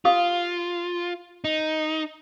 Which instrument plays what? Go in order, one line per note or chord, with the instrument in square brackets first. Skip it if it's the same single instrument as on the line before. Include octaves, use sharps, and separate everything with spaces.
[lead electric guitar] F4 [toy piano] G4 F5 D#6
[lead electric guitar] D#4